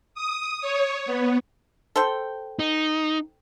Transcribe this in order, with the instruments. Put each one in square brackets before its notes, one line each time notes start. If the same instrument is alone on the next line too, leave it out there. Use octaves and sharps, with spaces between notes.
[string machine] D#6
C#5
B3
[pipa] A4 C5 G5
[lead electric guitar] D#4